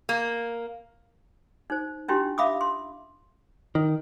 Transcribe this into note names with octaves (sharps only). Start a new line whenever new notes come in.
A#3
D#4 C5
C#4 D4 E4 F4 G4 C6
E5 F5 B5 D6 D#6
C6
D#3